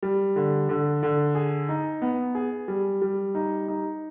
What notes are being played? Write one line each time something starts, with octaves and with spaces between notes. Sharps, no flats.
G3
D3
D3
D3
G#4
D#4
B3
G#4
G3
G3
D#4
D#4